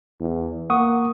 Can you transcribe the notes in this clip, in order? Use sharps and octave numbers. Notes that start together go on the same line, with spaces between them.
E2
A#3 F#5 C#6 D#6